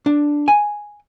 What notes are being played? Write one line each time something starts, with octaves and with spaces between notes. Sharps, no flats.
D4
G#5